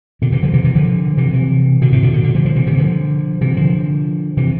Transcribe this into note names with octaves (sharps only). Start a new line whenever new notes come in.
B2 D3
C3 E3
D3 F3
C3 E3
C3 E3
D3 F3
C3 E3
C3 E3
B2 D3
A2 C3
B2 D3
B2 D3
B2 D3
D3 F3
D3 F3
C3 E3
C3 E3
D3 F3
C3 E3
D3 F3
C3 E3